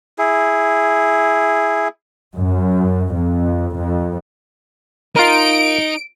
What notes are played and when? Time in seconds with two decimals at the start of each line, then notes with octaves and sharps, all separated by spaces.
0.18 E4 G#4
2.36 F#2
3.13 F2
3.76 F2
5.16 D#4 F4 A#4 D7